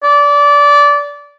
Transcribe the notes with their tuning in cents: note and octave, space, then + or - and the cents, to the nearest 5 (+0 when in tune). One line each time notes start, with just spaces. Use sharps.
D5 -20